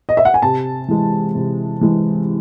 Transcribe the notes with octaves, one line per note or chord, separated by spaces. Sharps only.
D#5
E5
F#5
G#5
C3 A5
E3 G#3
C3
E3 G#3